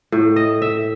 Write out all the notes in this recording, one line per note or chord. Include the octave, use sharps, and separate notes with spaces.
A2
D#5
E5